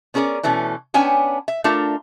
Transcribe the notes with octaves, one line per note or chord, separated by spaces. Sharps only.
B3 C#4 G#4 A#4 D5
B2 E3 A3 C#4
B3 C#4 D4 C#5 G5 G#5
E5
A3 D4 F4 A#4 E5